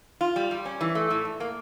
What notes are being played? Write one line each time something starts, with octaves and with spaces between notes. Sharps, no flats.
F4
G3
G3
C#4
E3
A3
A2
A2
A#3